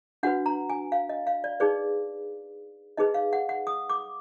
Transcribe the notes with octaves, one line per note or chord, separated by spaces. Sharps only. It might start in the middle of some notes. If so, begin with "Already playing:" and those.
D4 F#4 B4 F#5
A#5
G#5
F5
D#5
F5
D5
D#4 G#4 B4 D5
D#4 G#4 B4 D#5
F5
F#5
F#5
D#6
D6